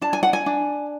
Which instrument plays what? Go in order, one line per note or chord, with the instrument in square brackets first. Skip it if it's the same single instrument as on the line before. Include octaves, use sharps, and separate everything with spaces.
[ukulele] D4 A5
G#5
F#5
G#5
D4